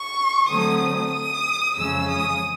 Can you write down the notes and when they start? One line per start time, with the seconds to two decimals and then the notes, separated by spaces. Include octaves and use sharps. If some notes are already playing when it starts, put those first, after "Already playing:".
Already playing: C#6
0.48 D3 F#3 A3 C4 D#6
1.12 D#6
1.76 F2 C#3 E3 G#3 C#4 E6
2.08 D#6